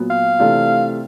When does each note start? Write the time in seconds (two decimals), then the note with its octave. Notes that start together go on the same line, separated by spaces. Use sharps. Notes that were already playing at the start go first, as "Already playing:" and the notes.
Already playing: A#2 F#3 B3
0.10 F5
0.39 C3 E3 A3 D4 F4